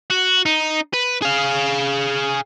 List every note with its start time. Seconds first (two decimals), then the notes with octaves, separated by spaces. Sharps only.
0.10 F#4
0.46 D#4
0.93 B4
1.22 G#4 F5